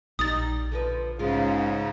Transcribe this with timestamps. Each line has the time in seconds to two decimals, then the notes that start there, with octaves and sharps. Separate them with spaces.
0.19 A#1 G3 D#4 G4 D#6 A6
0.72 D3 F3 B4
1.19 G#2 C#3 G#3 F4